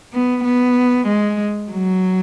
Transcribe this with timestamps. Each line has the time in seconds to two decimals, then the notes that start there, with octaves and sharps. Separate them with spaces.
0.13 B3
0.45 B3
1.07 G#3
1.72 F#3